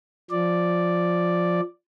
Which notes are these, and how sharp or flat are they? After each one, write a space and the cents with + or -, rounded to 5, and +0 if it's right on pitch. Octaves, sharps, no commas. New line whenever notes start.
F3 +5 D5 +0